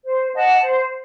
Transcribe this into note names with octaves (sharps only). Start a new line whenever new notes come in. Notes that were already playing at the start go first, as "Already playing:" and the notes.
C5
D#5 F#5 A5
C5